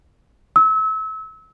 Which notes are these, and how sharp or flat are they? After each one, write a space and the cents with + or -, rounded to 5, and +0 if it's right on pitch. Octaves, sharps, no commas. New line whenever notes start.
E6 -30